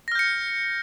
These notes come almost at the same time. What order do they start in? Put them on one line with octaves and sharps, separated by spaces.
A#6 F6 G6 C#7